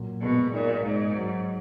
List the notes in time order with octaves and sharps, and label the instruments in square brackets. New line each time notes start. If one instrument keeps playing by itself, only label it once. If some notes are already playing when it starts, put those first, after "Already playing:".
Already playing: [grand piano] A#2 F#3
[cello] B2 [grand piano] G#3
[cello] A#2 [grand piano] D#4
[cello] G#2 [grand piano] D#4
[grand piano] F#3